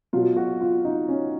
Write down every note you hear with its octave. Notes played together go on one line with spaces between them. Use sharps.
B2 F#3 F4
F#4
F4
D#4
C#4